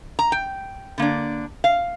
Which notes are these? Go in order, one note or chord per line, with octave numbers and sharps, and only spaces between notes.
A#5
G5
D3 A#3 D4
F5